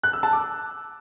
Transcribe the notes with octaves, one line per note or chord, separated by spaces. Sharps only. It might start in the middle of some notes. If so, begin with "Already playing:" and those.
F#6
E6
A5
D6